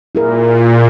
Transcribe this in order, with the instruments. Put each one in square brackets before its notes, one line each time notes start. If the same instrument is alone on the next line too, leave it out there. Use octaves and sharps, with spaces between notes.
[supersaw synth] A#2 [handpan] E4 G#4 A#4